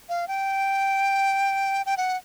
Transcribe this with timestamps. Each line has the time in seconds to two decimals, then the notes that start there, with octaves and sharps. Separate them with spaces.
0.09 F5
0.28 G5
1.86 G5
1.97 F#5